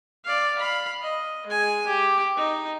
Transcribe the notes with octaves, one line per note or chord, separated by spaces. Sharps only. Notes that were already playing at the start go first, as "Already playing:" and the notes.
D5 F5
F5 B5
D#5
G#3 G#5
G4
D#4